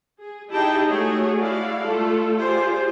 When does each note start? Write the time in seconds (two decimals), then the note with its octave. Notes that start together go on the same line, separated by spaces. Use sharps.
0.20 G#4
0.52 D#4 E4 G4 G#4 G5 A5
0.88 A3 F#4 G#4 C#5
1.38 E4 F#4 D5 F5
1.85 A3 F4 A4
2.38 F4 G4 G#4 C5 D5